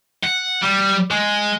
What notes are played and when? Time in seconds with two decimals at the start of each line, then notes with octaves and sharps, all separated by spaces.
0.23 F#5
0.62 G3
1.11 G#3